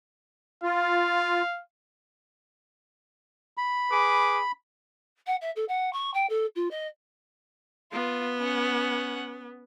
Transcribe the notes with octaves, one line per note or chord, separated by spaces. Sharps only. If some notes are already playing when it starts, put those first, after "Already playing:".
F4 F5
B5
G#4 B4 D6
F#5
E5
A4
F#5
C#6
G5
A4
F4
D#5
B3 F4
C#4 F#5